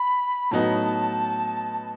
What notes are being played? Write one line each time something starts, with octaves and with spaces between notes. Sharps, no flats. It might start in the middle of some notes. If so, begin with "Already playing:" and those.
Already playing: B5
A2 F#3 B3 D#4 A5